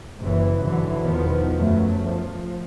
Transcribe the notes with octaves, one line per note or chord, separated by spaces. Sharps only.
F#1 E3
G#2 D3 E3 F#3
E2 B2 D#3 F3 B3
F#2 F#3 A3
F3